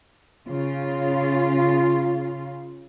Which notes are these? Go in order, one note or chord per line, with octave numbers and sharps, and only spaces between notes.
C#3 F4